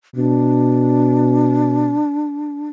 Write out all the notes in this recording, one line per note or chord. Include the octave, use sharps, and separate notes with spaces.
B2 D4